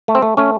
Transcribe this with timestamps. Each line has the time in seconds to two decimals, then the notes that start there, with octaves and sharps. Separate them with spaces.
0.08 A3
0.15 C4
0.22 A3
0.37 A3 C#4